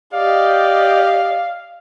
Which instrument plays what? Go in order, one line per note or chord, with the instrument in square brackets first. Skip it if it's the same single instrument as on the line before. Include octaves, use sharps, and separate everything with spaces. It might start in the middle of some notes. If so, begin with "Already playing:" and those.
[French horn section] G4 [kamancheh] D5 D#5 [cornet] F5